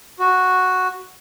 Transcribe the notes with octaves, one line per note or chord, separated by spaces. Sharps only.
F#4